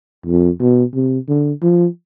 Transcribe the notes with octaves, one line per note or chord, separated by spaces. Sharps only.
F2
B2
C3
D3
F3